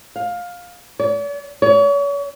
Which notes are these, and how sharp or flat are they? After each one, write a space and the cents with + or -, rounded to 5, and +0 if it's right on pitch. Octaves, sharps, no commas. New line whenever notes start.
F5 +15
D5 -45
C#5 +35